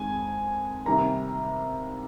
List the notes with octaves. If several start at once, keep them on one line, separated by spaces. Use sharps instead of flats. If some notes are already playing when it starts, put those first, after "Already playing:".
Already playing: F2 D#3 G#3 G#5
C3 D#3 G3 A#3 A#5